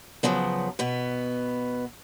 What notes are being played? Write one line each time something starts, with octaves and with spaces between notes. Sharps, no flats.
C#3 F3 F#3 B3
B2 B3